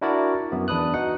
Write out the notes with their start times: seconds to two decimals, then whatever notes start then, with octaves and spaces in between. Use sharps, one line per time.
0.01 D4 E4 F#4 A#4 D5
0.52 F#2 B3
0.68 E2 D4 B4 D#6 F#6
0.94 D#4 F#4 F#5